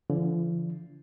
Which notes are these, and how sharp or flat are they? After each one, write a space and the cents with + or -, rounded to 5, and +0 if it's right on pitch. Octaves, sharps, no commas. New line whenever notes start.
D3 -30 F3 -45